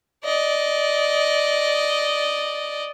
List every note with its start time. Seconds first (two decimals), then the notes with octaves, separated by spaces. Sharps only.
0.24 D5 D#5